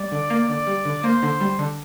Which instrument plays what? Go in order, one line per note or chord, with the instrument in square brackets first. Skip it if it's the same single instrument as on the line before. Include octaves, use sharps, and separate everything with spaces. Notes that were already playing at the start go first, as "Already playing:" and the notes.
Already playing: [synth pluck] G3 [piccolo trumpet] D5
[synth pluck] D3
A#3
[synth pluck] D3 [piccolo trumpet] D5
[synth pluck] G3
D3
[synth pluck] A#3 [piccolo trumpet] C5
[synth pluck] D3
G3
D3